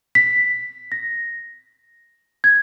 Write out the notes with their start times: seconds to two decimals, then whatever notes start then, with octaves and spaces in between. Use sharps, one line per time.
0.15 B6
0.92 A#6
2.44 G#6